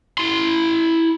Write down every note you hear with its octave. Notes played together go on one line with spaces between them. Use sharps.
E4 C6